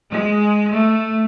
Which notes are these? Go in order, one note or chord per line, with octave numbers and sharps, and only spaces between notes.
G#3
A3